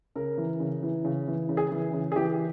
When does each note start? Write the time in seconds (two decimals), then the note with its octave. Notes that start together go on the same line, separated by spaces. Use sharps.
0.16 C#3 A#4
0.38 E3
0.60 C#3
0.83 E3
1.05 C#3
1.27 E3
1.49 C#3
1.57 G#4
1.72 E3
1.94 C#3
2.12 G#4
2.16 E3 G4